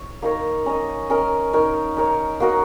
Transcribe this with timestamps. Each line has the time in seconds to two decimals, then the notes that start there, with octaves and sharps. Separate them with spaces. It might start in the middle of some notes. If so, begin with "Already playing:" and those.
Already playing: C#5
0.22 A#3 D#4 A#4 C#5
0.66 C#4 A#4 D#5
1.10 C#4 A#4 D#5
1.53 D#4 A#4 C#5
1.97 D#4 A#4 C#5
2.40 A#3 F#4 A#4 D#5